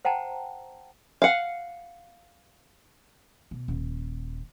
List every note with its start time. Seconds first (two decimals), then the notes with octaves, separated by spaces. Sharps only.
0.05 C5 F#5 G5 A5 A#5
1.22 F5 F#5
3.51 B2
3.68 D#1